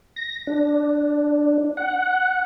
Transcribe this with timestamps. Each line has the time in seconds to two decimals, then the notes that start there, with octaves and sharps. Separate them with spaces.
0.16 A#6
0.47 D4
1.77 F#5